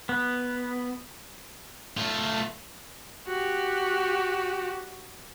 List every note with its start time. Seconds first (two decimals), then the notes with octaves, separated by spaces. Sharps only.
0.09 B3
1.97 A3 F4
3.27 F#4 G4